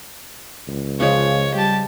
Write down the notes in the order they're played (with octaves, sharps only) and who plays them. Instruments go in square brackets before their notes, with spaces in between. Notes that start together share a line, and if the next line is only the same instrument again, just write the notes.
[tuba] C#2
[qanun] C#3 F3 G#3 [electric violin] C#5
[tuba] G3 [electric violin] G4 A5